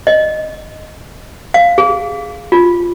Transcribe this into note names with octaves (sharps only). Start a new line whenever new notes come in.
D#5
F5
G#4
F4